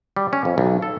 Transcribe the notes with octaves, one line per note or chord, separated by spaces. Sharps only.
G3
C#4
F2
B1
A4